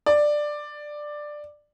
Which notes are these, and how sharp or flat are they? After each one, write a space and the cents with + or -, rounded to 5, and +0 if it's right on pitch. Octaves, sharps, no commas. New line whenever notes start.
D5 +10